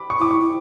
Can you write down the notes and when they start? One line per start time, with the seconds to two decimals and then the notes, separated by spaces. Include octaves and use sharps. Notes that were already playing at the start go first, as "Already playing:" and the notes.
Already playing: B5 D6
0.10 C#6
0.20 E4 D6
0.31 C#6
0.41 E4